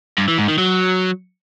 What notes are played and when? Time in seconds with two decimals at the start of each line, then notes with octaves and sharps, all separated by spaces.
0.18 G2
0.28 E3
0.38 G#2
0.48 D#3
0.58 F#3